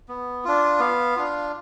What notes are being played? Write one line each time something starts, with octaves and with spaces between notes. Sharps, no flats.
B3
D4 F4
B3 F5
D4 F4